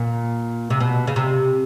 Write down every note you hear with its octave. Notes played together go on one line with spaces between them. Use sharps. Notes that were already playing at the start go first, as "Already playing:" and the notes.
Already playing: A#2
C3
B2
C#3
C3